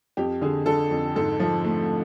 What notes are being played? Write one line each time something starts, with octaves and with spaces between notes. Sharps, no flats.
F2 G4
D3 G#4
D3 A4
F2
G#2 A4
F3
A3